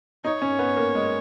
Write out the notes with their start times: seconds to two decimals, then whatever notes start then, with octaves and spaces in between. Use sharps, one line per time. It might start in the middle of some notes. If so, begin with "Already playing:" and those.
0.24 D#4 C#5
0.42 C#4
0.59 B3
0.76 A#3
0.95 G#3